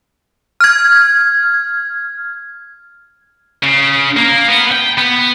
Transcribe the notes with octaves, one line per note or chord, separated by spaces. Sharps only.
F6 G#6
C#3
A#3
B3
G5
B3